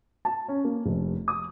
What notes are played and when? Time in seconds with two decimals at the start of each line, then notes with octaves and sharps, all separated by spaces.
0.25 A5
0.48 C#4
0.64 A#3
0.86 F1
1.28 D#6